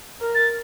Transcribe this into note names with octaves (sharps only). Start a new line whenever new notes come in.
A#4
A6